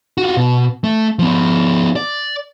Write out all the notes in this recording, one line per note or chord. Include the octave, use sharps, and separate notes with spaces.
F4 F#4
B2
A3
F3 B3
D5